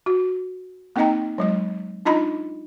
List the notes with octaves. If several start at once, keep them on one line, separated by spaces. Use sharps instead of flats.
F#4
A#3 C4 D#4 D#5 G5 A#5
F#3 G#3 D#5
D4 D#4 F4 D#5 A#5 B5